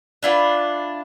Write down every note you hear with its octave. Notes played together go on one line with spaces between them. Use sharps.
D4 E4 F4 B4